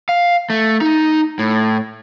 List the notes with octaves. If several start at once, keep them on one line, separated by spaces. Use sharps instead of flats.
F5
A3
D#4
A2